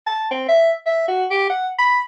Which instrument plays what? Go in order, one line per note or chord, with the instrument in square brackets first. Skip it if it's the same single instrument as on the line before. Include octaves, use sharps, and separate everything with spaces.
[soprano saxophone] A5
C4
E5
E5
F#4
G4
F#5
B5